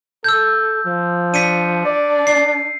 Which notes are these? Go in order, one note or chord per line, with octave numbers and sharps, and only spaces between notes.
A4 E6 G6
F3
D4 B6 C#7 D#7
D5
C7